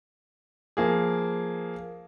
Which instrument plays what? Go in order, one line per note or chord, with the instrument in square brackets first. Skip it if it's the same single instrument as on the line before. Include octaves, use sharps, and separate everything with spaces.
[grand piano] F3 A#3 G#4